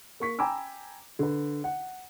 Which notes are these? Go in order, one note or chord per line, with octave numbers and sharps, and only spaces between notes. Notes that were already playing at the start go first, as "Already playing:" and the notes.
A#3 C#6 B6
G5 G#5 A#5 B5 D6 E6
D3 B4
F#5